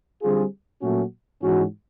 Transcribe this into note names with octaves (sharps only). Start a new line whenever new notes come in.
D3 G3 C4 F4 G#4
A#2 F#3 A3 C#4 F#4
G#2 E3 G#3 C#4 F#4